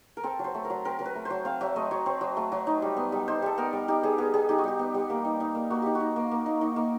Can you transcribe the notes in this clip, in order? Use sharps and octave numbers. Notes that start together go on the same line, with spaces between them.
A#4
C4 A4
F#3
C5
A3
A#4
F#3
C4 A#4
F#3 A#4
B4
A3
C5
F#3
C4 F5
F#3 E5
A3 D#5
F#3 C#5
C4 C5
F#3
A3
F#3
D#4
G3
B3
G3
D#4 C5
G3 A4
B3 A#4
G3
D#4 G4
G3 G#4
B3 G#4
G3 G#4
D#4 G4
F#4
G3 G4
B3
G3
A#3
D#4
D#4
A#3
A#3 F#4
D#4 G4
F#4
D#4
A#3
A#3
D#4
D#4
A#3